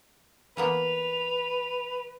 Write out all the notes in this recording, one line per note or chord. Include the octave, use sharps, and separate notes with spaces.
E3 A#3 B3 B4 F7